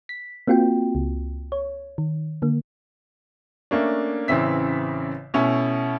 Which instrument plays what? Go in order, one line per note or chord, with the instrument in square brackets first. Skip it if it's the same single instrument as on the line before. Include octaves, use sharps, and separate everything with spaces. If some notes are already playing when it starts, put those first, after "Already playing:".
[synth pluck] B6
A#3 C4 F4 F#4 G5
C#2
C#5
D#3
D3 A#3
[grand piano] A3 A#3 C#4 D4
A1 C#3 E3 C4 E5 B6
B2 A3 C#4 E4